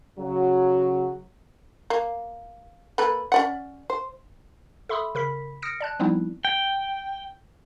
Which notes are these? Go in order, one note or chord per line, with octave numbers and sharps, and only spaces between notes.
C#3 F#3
A#3
A#3 A4 B4
C#4 D5 F#5
C5
A4 E5 B5 C6 D#6 E6
C#3 A#4 B5 B6
D#6 F6 A#6 C#7 D7
D5 A5 F#6
F3 G3 B3 C4 D#4 E4
G5